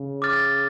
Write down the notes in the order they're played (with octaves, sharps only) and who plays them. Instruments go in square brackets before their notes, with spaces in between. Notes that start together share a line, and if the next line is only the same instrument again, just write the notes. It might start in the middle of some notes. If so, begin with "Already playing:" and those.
Already playing: [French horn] C#3
[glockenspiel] D6 F6 A6